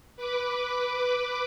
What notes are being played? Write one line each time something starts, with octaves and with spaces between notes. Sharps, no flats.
B4 D6